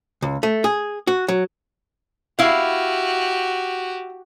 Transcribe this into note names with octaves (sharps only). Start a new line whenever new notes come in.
C#2
A3
G#4
F#4
F#3
E4 F#4 G4 F5